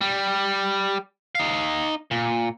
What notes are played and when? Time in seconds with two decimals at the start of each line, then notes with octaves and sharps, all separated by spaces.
0.01 G3
1.35 D#4 F5
2.11 A#2